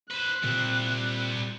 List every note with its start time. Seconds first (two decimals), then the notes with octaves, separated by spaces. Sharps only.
0.11 B4 C5 F#6
0.44 A#2 G3 C4